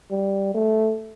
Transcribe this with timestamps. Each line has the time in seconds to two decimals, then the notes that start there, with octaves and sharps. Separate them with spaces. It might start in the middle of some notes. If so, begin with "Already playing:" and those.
0.11 G3
0.55 A3